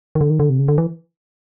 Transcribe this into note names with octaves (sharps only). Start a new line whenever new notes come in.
D#3
D3
D#3
D3
C3
C#3
D3
E3